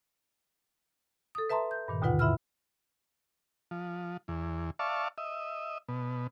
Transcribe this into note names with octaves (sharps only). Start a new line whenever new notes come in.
A4 D#6
B4 E5 A5 A#5 C6
G6
G2 A#2 D#3
D#2 B2 D3 F4 B4 F#5
G#2 E4 E5 B5 E6 F6
F3
E2
D5 E5 F5 A5 C#6
D#5 E5
B2